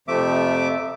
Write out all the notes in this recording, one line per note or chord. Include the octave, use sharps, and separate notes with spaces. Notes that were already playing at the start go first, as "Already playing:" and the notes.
F2 C3 F3 A3 E5 D6